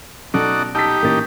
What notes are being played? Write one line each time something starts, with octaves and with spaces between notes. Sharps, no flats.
B2 F#3 C#4 D#4 F#4 A4 D5
D#4 G4 A5 E6 B6
A1 A#2 E3 A#3 C#4 A6